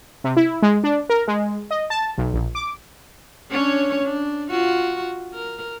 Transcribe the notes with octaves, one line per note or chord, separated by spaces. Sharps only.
C3
E4
G#3
D4
A#4
G#3
D#5
A5
B1
A#1
D6
C#4 D4 C#5
D4
F4 F#4
A#4